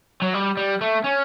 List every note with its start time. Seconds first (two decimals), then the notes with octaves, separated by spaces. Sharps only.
0.22 F#3
0.34 G3
0.57 G3
0.81 A3
1.04 C#4